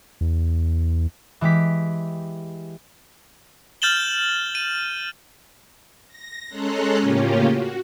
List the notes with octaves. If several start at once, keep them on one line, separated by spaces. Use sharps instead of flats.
E2
E3 G#3 G4 B6
F6 G6 A6 E7 F#7 G7
D#7
A#6
G#3 C#4 A4 A#5 C6 F#6
A2 C#3 A#3 C#4 F4 G4
F#4